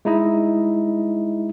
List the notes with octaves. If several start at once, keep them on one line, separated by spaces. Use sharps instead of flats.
G#3 D#4 E4 D#5